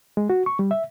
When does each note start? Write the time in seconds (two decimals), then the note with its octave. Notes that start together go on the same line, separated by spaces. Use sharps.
0.17 G#3
0.30 F#4
0.46 C#6
0.59 G3
0.71 E5